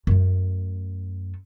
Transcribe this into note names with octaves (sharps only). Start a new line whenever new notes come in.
F#2 A3